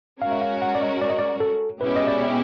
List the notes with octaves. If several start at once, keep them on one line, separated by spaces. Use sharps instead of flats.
G#3 C#4 F#4 A#4 F5
E5
F5
F#5
D5
D#5
D5
D#5
D5
A4
B2 G#3 C#4 E4 G4 B4
D#5
D5